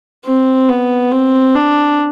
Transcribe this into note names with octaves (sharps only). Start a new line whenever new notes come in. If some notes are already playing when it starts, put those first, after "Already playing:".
C4
B3
C4
D4